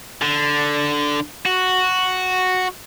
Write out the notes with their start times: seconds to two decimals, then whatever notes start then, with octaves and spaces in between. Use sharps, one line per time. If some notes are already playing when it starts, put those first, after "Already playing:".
0.22 D3
1.46 F#4